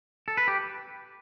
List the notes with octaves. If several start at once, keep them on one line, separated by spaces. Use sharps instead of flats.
A4
B4
G4